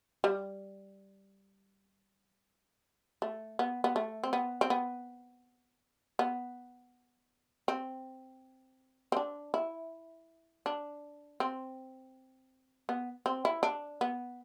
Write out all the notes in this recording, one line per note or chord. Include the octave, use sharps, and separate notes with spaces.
G3
A3
B3
B3
A3
C4
B3
C4
B3
B3
C4
C4
D4
E4
D4
C4
B3
C4
E4
D4
B3